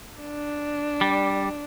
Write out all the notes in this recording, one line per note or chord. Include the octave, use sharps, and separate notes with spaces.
D4
G3